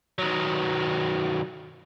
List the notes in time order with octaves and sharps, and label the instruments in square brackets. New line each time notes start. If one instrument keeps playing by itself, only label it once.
[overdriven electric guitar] D#3 F#3